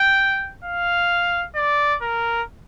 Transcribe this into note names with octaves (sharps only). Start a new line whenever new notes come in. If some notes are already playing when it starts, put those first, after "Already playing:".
Already playing: G5
F5
D5
A#4